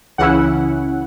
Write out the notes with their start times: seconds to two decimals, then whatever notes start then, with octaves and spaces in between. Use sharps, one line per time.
0.18 C#2 C#3 E3 C#4 E4 F#5